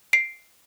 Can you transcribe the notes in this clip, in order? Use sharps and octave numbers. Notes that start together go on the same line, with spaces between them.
C7 D7